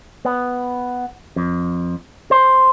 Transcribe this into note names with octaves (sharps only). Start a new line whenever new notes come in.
B3
F2
C5